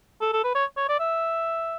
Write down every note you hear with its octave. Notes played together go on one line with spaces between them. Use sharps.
A4
A4
B4
C#5
C#5
D5
E5